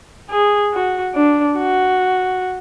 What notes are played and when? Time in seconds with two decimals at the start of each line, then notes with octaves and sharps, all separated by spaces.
0.30 G#4
0.72 F#4
1.14 D4
1.56 F#4